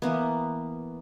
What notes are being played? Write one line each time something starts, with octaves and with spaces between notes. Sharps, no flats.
E3 A#3 B3